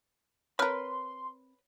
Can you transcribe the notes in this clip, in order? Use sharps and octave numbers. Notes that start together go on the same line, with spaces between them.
C4 A#4 B4 C#5 B5 C6 F6 F#6